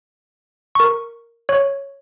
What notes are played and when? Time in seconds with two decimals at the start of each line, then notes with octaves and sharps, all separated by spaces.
0.75 A#4 C#6
1.49 C#5